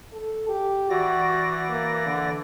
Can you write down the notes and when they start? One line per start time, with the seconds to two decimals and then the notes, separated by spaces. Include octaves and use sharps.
0.13 A4
0.49 G4
0.90 E3 F#4 D5 A#6
1.69 A#3
2.06 D3